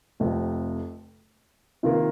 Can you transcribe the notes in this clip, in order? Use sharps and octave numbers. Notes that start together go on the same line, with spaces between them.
F1 F2 C3
C3 D#3 A#3 F4 A#4